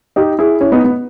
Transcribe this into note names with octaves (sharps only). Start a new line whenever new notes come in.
D#4 G4
E4 G#4
C#4 E4
B3 D#4
B3